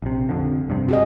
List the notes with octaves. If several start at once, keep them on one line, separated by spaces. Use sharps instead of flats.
A#1 C3
F2 D3
F1 G2 C3
F#4 G#4 D#5